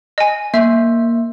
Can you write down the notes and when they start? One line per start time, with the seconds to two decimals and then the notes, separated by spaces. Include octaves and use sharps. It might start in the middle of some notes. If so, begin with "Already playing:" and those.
0.18 D#5 G#5
0.54 A#3 E5